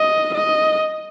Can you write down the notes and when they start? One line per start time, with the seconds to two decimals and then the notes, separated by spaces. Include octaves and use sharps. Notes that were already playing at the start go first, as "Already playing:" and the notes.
Already playing: D#5
0.34 D#5